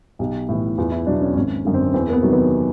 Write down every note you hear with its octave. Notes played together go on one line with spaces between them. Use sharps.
B1 G4
A2 E3
E2 F4
E4
B2 F#3 D4
C#4
G#1 C#4
F#2 D3
C4
E2 C4
A#3
B3
C3 D#3 F#3
B3